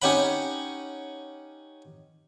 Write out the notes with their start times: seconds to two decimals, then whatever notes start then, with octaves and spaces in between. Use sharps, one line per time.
0.02 C#4 D#4 G4 C#5 F#5 B5